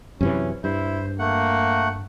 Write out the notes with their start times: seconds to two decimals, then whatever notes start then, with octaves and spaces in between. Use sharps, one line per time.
0.21 F#2 C3 E3 C#4
0.64 G2 E4 C5
1.19 A3 A#3 F#5